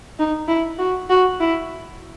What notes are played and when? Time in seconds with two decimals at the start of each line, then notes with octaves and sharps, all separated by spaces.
0.19 D#4
0.48 E4
0.79 F#4
1.10 F#4
1.40 E4